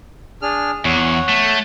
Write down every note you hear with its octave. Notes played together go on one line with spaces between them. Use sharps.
D4 G#4 F6
E2 C#5 F#5
A3